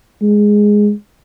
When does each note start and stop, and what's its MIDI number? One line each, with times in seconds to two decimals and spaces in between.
0.22 0.91 56